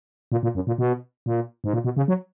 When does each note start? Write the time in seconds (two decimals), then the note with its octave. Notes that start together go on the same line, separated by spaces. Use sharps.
0.32 A#2
0.43 A#2
0.55 F#2
0.67 A#2
0.78 B2
1.26 A#2
1.64 G#2
1.73 A#2
1.84 B2
1.97 C#3
2.08 F#3